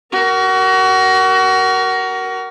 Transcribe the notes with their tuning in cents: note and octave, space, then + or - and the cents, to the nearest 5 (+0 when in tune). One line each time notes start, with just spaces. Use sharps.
F#4 +25 A#4 +0